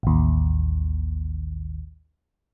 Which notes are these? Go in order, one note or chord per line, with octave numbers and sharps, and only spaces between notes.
A1 D#2